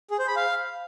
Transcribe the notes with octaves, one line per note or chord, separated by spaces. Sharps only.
G#4
C5
B5
F5